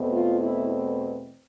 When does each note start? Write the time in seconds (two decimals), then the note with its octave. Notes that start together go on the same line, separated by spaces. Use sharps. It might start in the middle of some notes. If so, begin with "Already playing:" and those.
Already playing: E2 B2 A3 C4
0.11 F4
0.40 E4